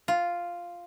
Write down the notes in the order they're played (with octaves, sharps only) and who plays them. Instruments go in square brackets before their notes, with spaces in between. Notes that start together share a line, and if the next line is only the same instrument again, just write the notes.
[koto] F4